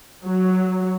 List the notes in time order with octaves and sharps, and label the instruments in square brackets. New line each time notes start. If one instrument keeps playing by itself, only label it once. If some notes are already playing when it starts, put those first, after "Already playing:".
[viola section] F#3